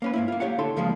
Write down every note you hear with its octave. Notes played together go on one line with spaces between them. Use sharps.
A#3 C#4 B4
G#2 A#3 E4
A#3 F4
G4 C#5 F5 F#5
D3 E4 A4 C6
C#2 F3 G3 G#3 A#3